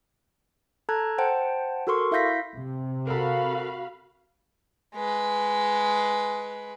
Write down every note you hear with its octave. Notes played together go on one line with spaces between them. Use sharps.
A4 A5 A#5 F#6 G#6
C5 F#5 G5 A5
F#4 A4 A#4 C6 C#6
E4 E5 F5 G6 A#6 B6
C3
F#4 A4 A#4 F5 B5
G#3 B4